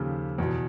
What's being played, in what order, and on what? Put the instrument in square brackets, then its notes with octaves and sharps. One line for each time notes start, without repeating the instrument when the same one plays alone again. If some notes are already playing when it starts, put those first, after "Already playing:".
Already playing: [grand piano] D#2 C#3 F3 G4 A4
E2 B2